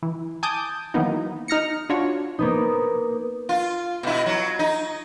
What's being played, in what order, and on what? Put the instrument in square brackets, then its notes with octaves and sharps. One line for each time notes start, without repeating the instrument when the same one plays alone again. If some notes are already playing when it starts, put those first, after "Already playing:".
[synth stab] E3
G#5 A5 D6 D#6 G6
D#3 E3 F#3 A#3 B3 D#4
D#4 F6 A#6 C#7
D4 F4 F#4 C#5
[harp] A#3 B3 D#4
[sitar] F4
B2 E4
F#3
D#4